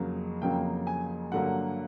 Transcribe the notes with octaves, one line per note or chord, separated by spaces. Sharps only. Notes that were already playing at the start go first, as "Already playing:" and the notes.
Already playing: F2 C#3 F#3 A#3
F2 C#3 F#3 A#3 G5
G#5
G2 D3 F#3 A#3 F#5